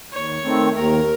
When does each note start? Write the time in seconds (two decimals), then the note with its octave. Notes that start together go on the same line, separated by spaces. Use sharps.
0.12 D#2 C#5
0.44 D#3 A3 C4
0.75 D#2 A#4